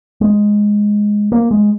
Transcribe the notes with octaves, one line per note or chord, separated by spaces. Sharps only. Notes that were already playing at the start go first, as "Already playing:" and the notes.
G#3
A#3
G#3